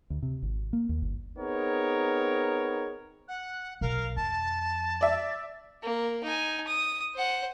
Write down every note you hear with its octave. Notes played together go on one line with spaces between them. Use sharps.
D2
C3
G#1
A#3
D#2
G1
B3 C4 D#4 G#4 A#4 C#5
F#5 F#6
B1 A#4 F5
F2 A5 A6
D5 E5
A#3
D#4 G#5
D#6
C5 F#5